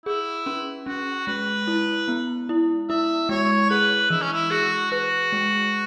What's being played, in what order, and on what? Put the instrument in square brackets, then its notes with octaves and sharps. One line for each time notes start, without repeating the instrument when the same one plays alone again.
[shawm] E4 [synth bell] G#4
[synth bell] C#4
[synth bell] C#4 [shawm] F#4
[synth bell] G#3 [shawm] B4
[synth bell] E4
B3
E4
[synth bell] E4 [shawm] E5
[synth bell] G#3 [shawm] C#5
[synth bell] G#4 [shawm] B4
[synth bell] E3 [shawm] E4
[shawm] C#4
E4
[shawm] F#4 [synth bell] G#4
[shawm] F#4 [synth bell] B4
[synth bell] G#3